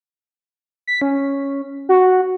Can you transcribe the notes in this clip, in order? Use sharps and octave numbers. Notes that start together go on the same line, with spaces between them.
B6
C#4
F#4